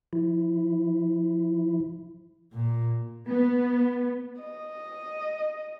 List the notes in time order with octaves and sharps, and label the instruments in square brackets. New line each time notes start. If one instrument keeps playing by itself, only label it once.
[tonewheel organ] F3 E4
[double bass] A#2
[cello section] B3
[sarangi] D#5